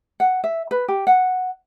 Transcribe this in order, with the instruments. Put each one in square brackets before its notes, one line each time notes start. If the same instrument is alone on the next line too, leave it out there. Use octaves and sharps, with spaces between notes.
[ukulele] F#5
E5
B4
G4
F#5